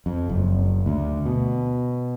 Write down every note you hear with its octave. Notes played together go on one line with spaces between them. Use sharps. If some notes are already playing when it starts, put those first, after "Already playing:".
F2
F#1
D2
B2